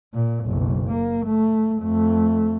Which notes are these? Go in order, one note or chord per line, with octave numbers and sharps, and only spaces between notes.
A#2
F#1 B1
A#3
A3
F2 A3